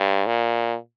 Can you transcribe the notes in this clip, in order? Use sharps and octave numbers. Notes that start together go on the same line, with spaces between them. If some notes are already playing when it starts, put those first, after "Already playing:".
Already playing: G2
A#2